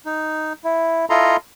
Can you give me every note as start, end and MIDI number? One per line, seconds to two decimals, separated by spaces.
0.06 0.53 63
0.64 1.05 64
1.10 1.37 64
1.10 1.37 65
1.10 1.37 69
1.10 1.37 75
1.10 1.37 82
1.10 1.37 84